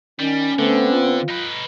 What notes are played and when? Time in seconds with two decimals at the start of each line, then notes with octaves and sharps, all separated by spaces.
0.20 D#3 G3 C#4
0.59 D3 A3 B3 C4
0.92 F4
1.29 D#4 B4